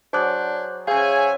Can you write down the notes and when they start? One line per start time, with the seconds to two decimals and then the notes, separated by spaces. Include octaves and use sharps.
0.13 F#3 D4 G#4 C5 D6 F#6
0.87 C#3 G#4 C5 C#5 E5 F5 G#5